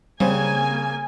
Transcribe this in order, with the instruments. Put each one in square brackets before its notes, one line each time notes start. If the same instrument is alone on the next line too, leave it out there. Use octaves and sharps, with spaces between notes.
[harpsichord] C#3 [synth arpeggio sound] G3 C4 [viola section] A#3 G#5